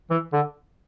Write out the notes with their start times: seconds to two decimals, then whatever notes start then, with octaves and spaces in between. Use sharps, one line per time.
0.10 E3
0.33 D3